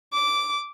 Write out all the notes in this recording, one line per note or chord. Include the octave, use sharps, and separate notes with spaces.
D6